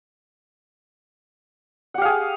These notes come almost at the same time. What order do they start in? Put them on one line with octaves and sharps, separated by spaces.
F#5 G4 F5 G#4